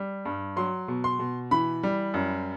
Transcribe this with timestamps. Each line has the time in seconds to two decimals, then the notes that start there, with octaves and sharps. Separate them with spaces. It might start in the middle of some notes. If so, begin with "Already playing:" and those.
Already playing: G3
0.25 G2
0.56 F#3 C6
0.88 B2
1.04 C6
1.19 B2
1.51 E3 B5
1.83 G3
2.14 F#2